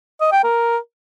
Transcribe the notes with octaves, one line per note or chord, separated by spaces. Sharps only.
D#5
G5
A#4